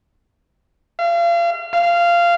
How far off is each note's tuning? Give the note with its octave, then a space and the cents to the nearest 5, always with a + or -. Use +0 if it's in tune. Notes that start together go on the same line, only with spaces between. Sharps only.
F5 -35
F5 -15